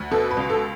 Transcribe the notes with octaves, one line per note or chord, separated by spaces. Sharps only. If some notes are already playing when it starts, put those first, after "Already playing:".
Already playing: D2
B2 A4
B4
C#2
A4